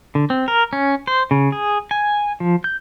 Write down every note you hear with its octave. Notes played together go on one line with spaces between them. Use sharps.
D3
C4
A#4
C#4
C5
C#3
G#4
G#5
F3
G6